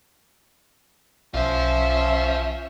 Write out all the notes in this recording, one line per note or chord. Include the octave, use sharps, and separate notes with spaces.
B1 C#4 F4 C5 E5